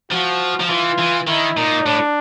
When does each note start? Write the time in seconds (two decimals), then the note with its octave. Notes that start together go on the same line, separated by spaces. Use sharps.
0.11 F3 F#4
0.60 F3
0.69 E3 F4
0.99 E3
1.27 D#3 E4
1.57 A#2 D#4
1.86 A2 D4